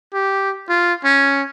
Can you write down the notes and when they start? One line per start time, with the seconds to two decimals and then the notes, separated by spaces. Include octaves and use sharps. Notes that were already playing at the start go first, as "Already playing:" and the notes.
0.13 G4
0.69 F4
1.04 C#4